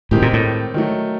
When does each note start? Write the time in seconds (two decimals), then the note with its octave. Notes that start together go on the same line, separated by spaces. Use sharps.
0.11 A2 D#3 G#3 C4 D#4 G4
0.22 A#2
0.33 A2
0.74 D#3 F#3 A3